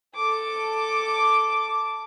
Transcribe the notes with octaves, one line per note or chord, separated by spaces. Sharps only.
A4 D6